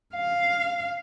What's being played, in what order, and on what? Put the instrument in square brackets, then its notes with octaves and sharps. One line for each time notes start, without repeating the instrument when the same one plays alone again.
[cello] F5